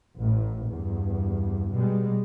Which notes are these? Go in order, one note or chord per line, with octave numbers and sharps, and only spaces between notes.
A1 A2
E2 G2
B2 G3 G#3